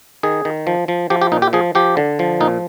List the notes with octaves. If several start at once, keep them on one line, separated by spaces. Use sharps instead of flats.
D#3 G#4
D#3
F3
F3
F3 G4
G4
A#2 D#4
G4
F3 G#4
F3 G4
D3
F3
A#2 D#4